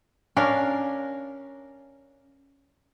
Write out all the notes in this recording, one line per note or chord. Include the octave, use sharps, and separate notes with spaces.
C#4 D4 A#4 F5